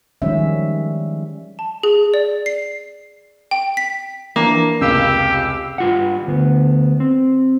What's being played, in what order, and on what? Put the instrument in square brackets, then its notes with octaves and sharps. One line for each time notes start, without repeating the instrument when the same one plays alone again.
[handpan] D#3 F3 G3 G#3 C#4 E5
[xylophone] A5
G#4
D5
C7
G5
B6
[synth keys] E3 F3 D4 [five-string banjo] A#3
[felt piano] F1 C#2 [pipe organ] G4 [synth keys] F5 E6
[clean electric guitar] G2 F4 F#5
D2 B3
C4